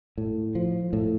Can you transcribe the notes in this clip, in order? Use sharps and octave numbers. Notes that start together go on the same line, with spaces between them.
A2
F3
A2